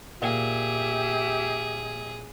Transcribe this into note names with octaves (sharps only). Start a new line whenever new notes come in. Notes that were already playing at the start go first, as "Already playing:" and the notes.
A#2 G4 G#4 E5